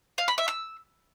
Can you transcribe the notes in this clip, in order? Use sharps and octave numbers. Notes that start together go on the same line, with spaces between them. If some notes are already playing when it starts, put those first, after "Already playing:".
F5
B5
E5
E6